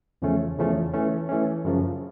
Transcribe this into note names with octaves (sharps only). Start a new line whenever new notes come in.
E2 C#3 F3 A3 C#4
E2 C#3 F3 A3 C#4
E3 A3 C#4
E3 A3 C#4
F#2 C#3 F3